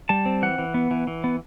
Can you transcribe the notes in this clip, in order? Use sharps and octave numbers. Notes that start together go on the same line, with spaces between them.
G3 A5
C4
E3 F#5
E3
B3
E3
E3
B3